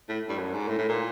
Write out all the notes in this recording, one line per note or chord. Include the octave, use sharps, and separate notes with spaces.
A2
G2
F#2
G#2
A2
A2
A#2